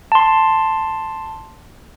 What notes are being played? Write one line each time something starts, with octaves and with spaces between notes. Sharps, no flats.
A5 C6